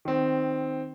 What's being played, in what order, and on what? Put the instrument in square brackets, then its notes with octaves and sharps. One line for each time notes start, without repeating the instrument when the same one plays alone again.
[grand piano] D#3 C4